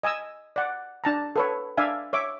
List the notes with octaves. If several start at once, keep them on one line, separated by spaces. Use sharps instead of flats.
D#5 G#5 D#6 E6
D5 F#5
D4 A5 A#5
A4 B4 C#5
D4 D5 E5 F5 G#5
C#5 E5 D6